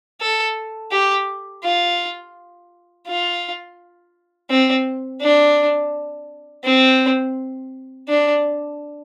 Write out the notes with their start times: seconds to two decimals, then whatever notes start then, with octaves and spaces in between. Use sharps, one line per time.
0.21 A4
0.92 G4
1.64 F4
3.07 F4
4.50 C4
5.22 D4
6.65 C4
8.09 D4